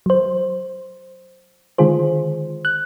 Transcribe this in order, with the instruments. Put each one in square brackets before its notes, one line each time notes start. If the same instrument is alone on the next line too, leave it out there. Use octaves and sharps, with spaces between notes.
[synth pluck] F#3 C5
D3 D#3 G#3 F4 G#4 C5
F#6